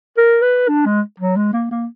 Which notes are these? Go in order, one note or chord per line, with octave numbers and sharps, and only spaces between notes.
A#4
B4
D4
G#3
F#3
G#3
A#3
A#3